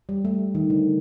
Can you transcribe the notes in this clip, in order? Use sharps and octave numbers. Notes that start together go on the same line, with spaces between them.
G3
A3
D#3
D3